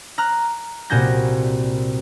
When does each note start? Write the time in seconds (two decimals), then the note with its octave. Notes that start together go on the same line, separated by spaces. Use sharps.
0.18 A#5 F6 F#6
0.90 C2 A#2 F#4 G#5 G6 A#6